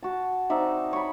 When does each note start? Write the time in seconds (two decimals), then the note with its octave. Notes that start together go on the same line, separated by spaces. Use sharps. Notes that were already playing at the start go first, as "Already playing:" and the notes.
0.03 F#4 A5
0.50 C4 D#4 D5 E5
0.93 C#5 B5